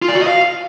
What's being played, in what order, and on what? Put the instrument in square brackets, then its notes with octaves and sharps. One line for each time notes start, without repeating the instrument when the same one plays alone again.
[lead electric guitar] F4
D5
F#4
D#5
F5